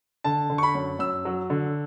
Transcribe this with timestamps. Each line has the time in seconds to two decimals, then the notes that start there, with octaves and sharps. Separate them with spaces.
0.24 D3 A5
0.50 D3
0.58 C#6
0.63 B5
0.75 F#2
0.99 F#2 E6
1.25 F#3
1.50 D3